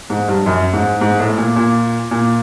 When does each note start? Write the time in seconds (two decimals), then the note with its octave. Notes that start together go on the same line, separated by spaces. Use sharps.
0.10 G#2
0.28 G2
0.46 F#2
0.73 G#2
1.01 G#2
1.20 A2
1.37 A#2
1.56 A#2
2.11 A#2